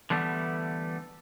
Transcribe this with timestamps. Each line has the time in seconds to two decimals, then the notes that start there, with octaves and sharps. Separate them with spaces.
0.10 D3 E3 G3 A3 B3